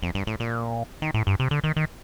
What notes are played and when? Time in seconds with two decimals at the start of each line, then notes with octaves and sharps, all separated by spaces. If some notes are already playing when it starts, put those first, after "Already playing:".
0.03 F2
0.15 G2
0.27 A2
0.40 A#2
1.02 D#3
1.14 A2
1.27 G2
1.40 C3
1.51 D3
1.64 D#3
1.76 D#3